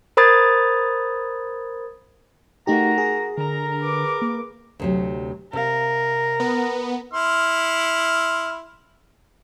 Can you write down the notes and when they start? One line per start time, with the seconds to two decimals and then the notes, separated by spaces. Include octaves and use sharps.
0.17 A#4 C5 B5 D#6 G#6 A6
2.67 A3 D#4 F#4 G4 A#4 A#5
2.98 G#4
3.38 D3 A#4 A#5
3.81 B4 D6
4.22 A#3
4.80 D2 C3 F#3
5.53 C3 A#4 F5
6.40 B3
7.14 E4 C6 F6